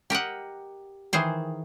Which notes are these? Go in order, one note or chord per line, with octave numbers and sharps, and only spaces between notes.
G4 A#4 D#5 F#5
D#3 E3 G#4 C5